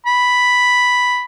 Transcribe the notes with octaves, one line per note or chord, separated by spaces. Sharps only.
B5